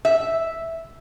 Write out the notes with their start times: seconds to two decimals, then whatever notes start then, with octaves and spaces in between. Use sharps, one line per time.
0.05 E5